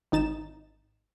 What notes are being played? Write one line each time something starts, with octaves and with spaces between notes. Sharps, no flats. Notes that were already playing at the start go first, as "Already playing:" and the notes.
G#1 D#4 A6 E7